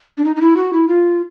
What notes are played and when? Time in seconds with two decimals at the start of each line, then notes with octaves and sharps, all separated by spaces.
0.18 D4
0.25 D#4
0.36 D#4
0.41 E4
0.57 F#4
0.73 E4
0.88 F4